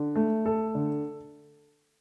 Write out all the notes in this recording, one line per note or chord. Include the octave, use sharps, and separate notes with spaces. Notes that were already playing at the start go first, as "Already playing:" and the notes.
Already playing: D3
A3
A4
D3